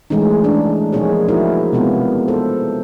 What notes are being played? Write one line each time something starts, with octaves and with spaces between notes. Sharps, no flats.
E3 G#3 A3 C#4 D#4
D4
F3 A#3 C#4 D#4 G#4 C#5
D#4 E4 F#4 A#4 C5
C3 G#3 B3 F4
A4 C5